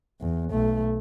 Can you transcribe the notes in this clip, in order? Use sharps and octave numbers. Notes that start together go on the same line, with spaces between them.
E2
B1 A3